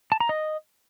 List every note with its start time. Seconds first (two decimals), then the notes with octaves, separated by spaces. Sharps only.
0.12 A5
0.20 A#5
0.29 D#5